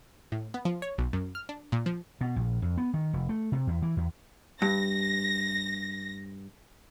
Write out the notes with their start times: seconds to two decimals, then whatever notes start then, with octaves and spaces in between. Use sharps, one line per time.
0.32 A2
0.54 B3
0.65 F3
0.82 C#5
0.98 B1
1.13 F#2
1.35 F6
1.49 D4
1.72 A#2
1.86 F3
2.21 B2
2.36 A#1
2.62 F2
2.77 B3
2.94 D#3
3.13 F1
3.29 A3
3.52 C3
3.67 E2
3.82 E3
3.97 E2
4.62 G2 A#6